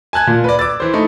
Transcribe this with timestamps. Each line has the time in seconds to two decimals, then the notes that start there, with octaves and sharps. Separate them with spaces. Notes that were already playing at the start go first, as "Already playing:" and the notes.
0.13 G#5 A5 F#6 G#6
0.27 A#2
0.44 B4 D5
0.59 D6 E6 A6
0.80 E3 C5
0.93 A3 D#4 E4